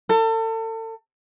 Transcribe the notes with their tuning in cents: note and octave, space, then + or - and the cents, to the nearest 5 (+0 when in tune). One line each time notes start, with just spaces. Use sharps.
A4 +35